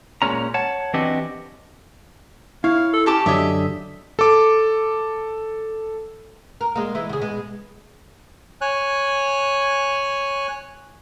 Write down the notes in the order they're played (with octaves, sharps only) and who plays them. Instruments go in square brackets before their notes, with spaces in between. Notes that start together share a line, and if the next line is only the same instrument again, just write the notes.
[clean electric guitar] A#2 G#3 C#4 A#5
C#5 F#5 A5
E3 C4 D4 F#4 G4 D#5
[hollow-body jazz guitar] E4 [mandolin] C#5 [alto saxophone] F5
[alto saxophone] A4
[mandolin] C#4 A5 D6 [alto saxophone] G4
[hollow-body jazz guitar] F#2 D3 C#5 [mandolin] D#5 E5
[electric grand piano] A4 D6
[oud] A#4
G#3 A#3
E3 G#3 E4
C#3 G#4
B2 G#3
[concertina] C#5 G#5 F#6